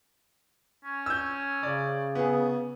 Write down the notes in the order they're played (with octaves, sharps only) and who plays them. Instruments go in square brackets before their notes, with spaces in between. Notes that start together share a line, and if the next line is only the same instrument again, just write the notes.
[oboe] C#4
[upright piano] E6 G6
[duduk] C#3 [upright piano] D5
[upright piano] B3 G#4